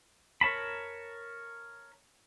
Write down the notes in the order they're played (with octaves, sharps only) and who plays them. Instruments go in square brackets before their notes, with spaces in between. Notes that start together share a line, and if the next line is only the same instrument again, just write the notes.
[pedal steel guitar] A#4 C#5 A5 B5